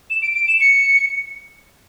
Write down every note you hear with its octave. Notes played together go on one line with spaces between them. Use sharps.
E7
D7
D7
E7
C#7